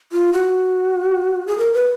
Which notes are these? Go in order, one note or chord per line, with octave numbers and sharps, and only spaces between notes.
F4
F#4
G#4
A#4
B4